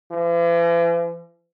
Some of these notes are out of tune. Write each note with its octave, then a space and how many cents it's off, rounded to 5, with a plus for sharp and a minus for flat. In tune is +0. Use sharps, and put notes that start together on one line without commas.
E3 +45